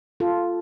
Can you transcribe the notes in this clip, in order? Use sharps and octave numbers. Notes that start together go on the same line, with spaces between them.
F4 A4